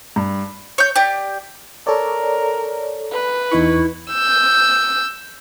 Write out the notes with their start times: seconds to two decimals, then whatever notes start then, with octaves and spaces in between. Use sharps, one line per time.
0.16 G2
0.78 C#5 G6
0.96 G4 D5
1.87 A4 A#4 C#5 D5
3.11 B4
3.52 E2 D#4 E4 C#6
4.13 E6 G6